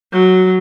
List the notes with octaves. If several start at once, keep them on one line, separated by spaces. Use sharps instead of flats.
F#3